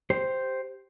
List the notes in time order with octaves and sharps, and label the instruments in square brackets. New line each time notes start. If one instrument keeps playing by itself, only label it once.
[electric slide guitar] G4 C5